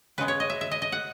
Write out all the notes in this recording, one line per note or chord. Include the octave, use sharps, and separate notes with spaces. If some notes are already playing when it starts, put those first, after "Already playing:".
C#3 G#3 B3 B4
C#5
D#5
E5
E5
D#5
D#5
F#5